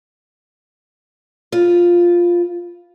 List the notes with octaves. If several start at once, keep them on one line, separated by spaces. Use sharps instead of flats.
F4 B4